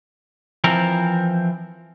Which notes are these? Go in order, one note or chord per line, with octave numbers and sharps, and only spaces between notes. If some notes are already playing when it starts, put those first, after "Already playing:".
E3 F3 C4 A#4